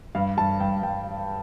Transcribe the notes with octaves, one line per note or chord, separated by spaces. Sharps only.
G2 F5
G2 A5
G2 G5
G2 G5